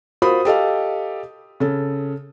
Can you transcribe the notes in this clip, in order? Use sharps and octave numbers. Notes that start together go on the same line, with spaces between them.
F4 F#4 A#4 C5 B5 D#6
G4 A4 D#5 F5
C#3 A4